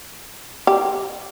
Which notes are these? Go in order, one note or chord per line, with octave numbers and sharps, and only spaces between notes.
G4